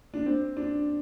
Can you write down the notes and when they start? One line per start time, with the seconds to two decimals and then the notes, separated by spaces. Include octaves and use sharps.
0.14 D4
0.26 C4
0.57 D4